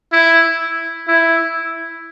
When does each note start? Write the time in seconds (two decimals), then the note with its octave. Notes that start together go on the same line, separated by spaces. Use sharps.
0.12 E4
1.08 E4